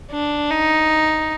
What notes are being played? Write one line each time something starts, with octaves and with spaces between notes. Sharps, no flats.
D4
D#4